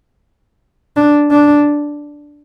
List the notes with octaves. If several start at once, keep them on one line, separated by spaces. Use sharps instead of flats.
D4
D4